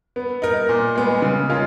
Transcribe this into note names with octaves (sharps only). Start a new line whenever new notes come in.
B3
D#4 A#4
A#2
G#3 B3
C#3
G#3 C#4 F4 A#4